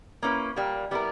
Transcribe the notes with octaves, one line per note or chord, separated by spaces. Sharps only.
A#3 C#4 E4 B4
A#2 G3 A#3
G3 B3 E4 A#4